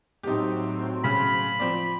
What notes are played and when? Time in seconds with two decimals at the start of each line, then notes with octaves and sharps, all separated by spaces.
0.23 A2 F#3 C4 D#4 G4
1.04 C#3 B5
1.60 F3 C4 D5